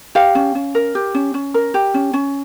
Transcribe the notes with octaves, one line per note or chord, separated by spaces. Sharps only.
G4 F5
C#4
C#4
A#4
G4
C#4
C#4
A#4
G4
C#4
C#4